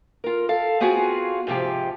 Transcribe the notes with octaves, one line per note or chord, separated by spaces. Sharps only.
F4 A#4
A4 F5
B3 C4 F4 F#4 G#4
G#2 C3 F3 G4